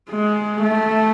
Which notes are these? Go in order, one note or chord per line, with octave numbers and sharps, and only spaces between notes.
G#3
A3